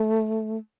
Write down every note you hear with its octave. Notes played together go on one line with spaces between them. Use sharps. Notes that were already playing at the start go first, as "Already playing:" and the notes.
Already playing: A3